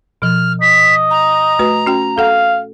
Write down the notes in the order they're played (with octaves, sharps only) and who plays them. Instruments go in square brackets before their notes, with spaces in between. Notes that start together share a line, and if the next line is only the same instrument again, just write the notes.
[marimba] B2 F3 [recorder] F6
[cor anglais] D#5 [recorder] B6
[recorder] A#5
[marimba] A3 F#4 B4
C#4 F#4 G5
[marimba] A4 F#5 [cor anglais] F5